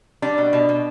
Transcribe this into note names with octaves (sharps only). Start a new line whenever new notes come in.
G3 D4
B2
B2
B2